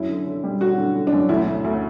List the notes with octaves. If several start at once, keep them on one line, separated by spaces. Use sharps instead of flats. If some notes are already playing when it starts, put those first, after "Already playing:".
Already playing: F#2 E4
D3
D3
G3
D3 F#4
D3
D3
D4
F#2
D2 E4
D2
D2